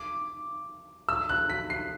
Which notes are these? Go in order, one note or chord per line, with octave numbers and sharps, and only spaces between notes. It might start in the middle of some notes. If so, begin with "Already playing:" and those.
Already playing: D6
E6
F#6
B6
C7